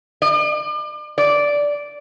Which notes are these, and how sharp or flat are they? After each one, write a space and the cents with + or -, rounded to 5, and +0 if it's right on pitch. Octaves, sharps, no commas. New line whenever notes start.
D5 +40
D5 -10